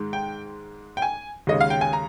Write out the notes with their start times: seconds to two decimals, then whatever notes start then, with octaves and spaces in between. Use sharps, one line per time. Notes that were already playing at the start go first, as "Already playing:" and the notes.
Already playing: G#2 D#3 G#3
0.13 G5
0.97 G5
1.02 G#5
1.47 D#2 C#3 G#3 C#4 D#5
1.61 F5
1.70 G5
1.81 G#5
1.93 A#5